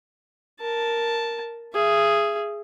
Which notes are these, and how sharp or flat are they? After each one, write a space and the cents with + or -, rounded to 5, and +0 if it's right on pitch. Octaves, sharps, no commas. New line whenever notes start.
A#4 +0 A5 +0
G#4 +0 E5 +40